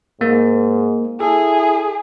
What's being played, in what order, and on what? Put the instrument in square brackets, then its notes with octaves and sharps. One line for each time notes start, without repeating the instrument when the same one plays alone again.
[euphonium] G#2 [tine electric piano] A#3
[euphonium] E4 [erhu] G#4 [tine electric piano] A4